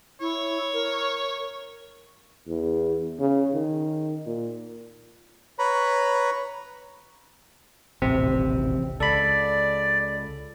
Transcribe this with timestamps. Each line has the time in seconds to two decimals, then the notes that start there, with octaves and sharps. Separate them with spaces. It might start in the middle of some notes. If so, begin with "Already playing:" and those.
0.21 E4 C#5
0.74 A#4
2.48 E2
3.19 C#3
3.53 D#3
4.26 A#2
5.59 B4 C#5 A#5 B5
8.02 D#1 A1 C3 C4
9.00 C#2 A4 D5 B5